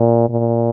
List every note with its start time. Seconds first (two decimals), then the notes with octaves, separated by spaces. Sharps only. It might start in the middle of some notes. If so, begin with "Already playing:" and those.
Already playing: A#2
0.30 A#2